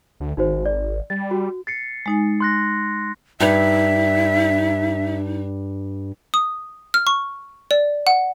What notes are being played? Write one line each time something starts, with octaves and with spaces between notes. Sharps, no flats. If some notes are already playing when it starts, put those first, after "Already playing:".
D2
G#1 D#4 F#4 C5
D5
G3 A6
F#4
A6 C7 C#7
G#3 D#4 G#5
C6 F#6 A#6
G2 D#4 E5
D#6
F6
C#6
D5
F#5